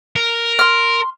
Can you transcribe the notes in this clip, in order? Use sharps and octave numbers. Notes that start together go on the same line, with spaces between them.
A#4
C6 F6